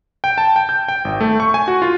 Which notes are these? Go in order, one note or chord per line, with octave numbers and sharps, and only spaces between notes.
G5
A5
G5
G6
G5
G#1
A3
C#6
G#5
F#4
F4